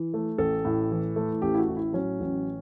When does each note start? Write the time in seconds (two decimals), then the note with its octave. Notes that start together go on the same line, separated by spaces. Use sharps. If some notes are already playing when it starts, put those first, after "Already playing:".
Already playing: E3
0.14 A3
0.38 A1 A4
0.65 A2
0.91 E3
1.16 A3
1.42 A1 G4
1.54 E4
1.59 F#4
1.68 A2
1.77 E4
1.93 F#3 C#4
2.20 A1